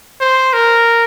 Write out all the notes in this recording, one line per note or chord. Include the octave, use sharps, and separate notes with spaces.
C5
A#4